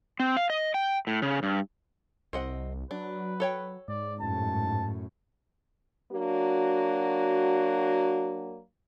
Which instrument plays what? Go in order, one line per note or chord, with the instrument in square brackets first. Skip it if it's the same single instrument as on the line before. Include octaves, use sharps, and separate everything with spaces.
[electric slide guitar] C4
F5
D#5
G5
A2
C#3
G2
[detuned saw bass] C2 [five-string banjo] C4 D#5 F#5
[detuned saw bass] F#3 [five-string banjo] D4 [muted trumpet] B4
[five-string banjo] A4 C#5 G5
[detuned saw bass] G#2 [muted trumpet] D5
[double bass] F#2 A2 [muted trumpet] A5
[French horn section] F#3 A#3 D4 F#4